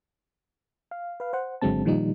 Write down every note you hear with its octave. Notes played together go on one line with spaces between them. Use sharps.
F5
B4 F5
C5 F#5
G#1 D3 F#3 G#3 C4 A5
A#2 D#3 F3 G3 D#4